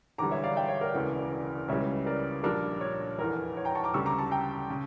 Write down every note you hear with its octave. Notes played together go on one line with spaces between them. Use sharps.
E1 E2 D3 G3 A#5 D6
C#5 E5
D5 F5
E5 G5
C#5 E5
A#4 D5
E1 D2 C#3 E3
C#2 C#3 E3 G3 C#5 E5
A#4 D5
A#1 A#2 G3 D4 A#4
C#5
F1 E2 E3 A#4
C#5
G5 A#5
A5 C#6
A#5 D6
D2 C#3 G3 C#6 E6
A#5 D6
A5 C#6
G5 A#5
C#3